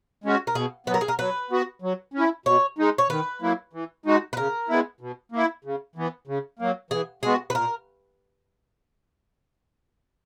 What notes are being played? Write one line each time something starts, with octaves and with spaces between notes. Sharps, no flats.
G#3 C#4 F#4
A#4
B2 G#4
F#3 B3 B4
A#4
G#4
A#4
F#3 B4
B3 F#4
F#3
C#4
E4
B2 C#5
G#3 D#4
C#5
D#3 B4
F#3 A#3 E4
E3
G#3 D#4 F#4
B4
C#3 A#4
G#3 B3 E4
B2
A#3 E4
C#3
E3 B3
C#3
F#3 A#3
E3 G#4
G#3 B3 F#4 G#4
B4
A#2 A#4